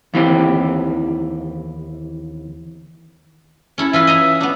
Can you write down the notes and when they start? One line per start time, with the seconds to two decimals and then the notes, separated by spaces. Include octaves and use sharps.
0.14 D#2 E3 C4 G4
3.78 C#4 E4 A4
3.93 E3 F4 B4 E5
4.07 D#5 G#5 A#5
4.40 B3 D4